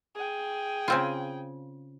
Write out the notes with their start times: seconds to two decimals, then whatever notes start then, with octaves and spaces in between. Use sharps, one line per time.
0.16 G#4 G5
0.88 C#3 C4 F4